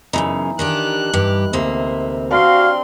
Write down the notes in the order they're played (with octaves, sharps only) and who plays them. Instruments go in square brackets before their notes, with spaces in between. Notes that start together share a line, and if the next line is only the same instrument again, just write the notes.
[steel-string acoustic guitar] F#2 A2 C#3 [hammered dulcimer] E3 D#4
[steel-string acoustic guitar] D#3 D4 G4 [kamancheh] F#6
[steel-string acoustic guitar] G2 G4
[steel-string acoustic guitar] D2 C3 A#3 [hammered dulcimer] C5 [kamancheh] E5
[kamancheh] C4 C6 [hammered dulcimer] D4 G4 [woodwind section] F#4 F5